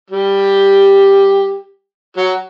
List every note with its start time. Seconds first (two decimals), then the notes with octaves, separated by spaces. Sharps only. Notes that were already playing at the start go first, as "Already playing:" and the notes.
0.10 G3 G4
2.17 F#3 F#4